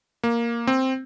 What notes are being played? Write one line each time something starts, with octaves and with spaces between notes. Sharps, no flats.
A#3
C4